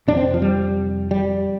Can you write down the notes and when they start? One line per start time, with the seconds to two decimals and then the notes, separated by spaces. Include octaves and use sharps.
0.08 F2 C3 D4
0.17 C4
0.34 F3
0.42 G3
1.11 G3